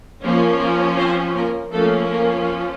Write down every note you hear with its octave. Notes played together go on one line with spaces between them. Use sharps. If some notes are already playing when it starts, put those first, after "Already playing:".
F3 A#3 C#4
A#3 A#4
C4 C5
A#3 A#4
F3 A3 A#3 C#4 A4
A#3 A#4